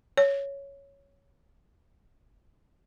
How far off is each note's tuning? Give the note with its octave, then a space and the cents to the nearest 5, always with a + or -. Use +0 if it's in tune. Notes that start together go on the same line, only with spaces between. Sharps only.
C#5 +5